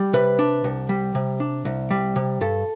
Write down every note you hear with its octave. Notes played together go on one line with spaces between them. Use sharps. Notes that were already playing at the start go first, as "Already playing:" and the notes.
Already playing: G3
C3 B4
D4
C2
G3
C3
D4
C2
G3
C3
G2 A4